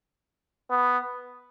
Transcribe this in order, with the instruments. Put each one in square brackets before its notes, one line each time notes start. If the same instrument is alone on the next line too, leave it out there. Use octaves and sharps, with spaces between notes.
[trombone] B3